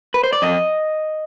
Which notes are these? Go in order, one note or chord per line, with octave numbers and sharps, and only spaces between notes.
B4
C5
D5
F2 D#5